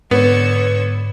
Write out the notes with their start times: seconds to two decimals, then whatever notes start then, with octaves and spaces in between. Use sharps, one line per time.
0.11 G#2 D3 B3 C#5 E6